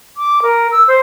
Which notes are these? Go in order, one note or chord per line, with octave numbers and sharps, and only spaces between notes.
D6
A#4
E6
C5